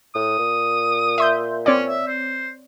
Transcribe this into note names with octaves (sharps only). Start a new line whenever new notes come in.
A2 D#6
A#2
E5 C6 G6
C4 C#4 C#5 D5
E5
C5